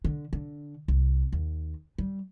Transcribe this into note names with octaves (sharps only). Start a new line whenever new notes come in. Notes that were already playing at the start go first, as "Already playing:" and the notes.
D3
D3
C2
D#2
G3